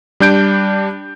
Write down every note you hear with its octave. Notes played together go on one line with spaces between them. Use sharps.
G3 D4 G6 D7